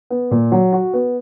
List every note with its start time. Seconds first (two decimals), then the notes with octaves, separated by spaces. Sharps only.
0.10 B3
0.31 A#2
0.52 F#3
0.73 F#4
0.93 B3